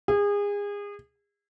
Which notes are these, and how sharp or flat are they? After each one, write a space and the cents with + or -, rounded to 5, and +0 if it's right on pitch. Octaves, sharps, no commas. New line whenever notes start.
G#4 -30